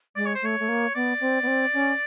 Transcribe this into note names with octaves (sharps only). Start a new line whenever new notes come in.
G#3 D5
C#5
C5
A3 C#5
A3
A#3
B3 D5
C4
B3
C4
C#4